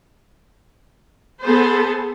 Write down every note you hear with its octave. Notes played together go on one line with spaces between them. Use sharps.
B3 G#4 A4 C5